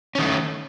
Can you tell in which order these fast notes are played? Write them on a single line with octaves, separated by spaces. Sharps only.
C#4 D#3 A3